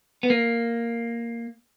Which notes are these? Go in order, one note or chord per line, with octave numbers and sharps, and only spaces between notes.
B3
A#3